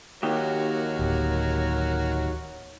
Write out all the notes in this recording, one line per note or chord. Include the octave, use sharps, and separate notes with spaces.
D#2 F#4 G4 A#4 C#5
D1